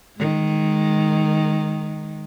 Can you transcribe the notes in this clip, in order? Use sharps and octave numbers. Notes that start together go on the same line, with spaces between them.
D#3 G#3